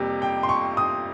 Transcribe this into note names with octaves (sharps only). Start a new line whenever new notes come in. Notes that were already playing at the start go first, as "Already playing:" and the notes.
Already playing: F2 C3 G3 A#3
G5
C6
C#6
D#6